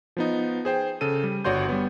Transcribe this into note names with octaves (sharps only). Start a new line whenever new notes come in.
F3 B3 D#4
G#4 C5 G5
C#3 A4 D#7
G3
G1 F#4 C#5 D5 C6 G6
G3 B3